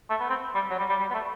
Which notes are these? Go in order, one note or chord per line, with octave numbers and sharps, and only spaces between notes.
A3
B3
C4
G3
F#3
G3
G3
G3
B3
A3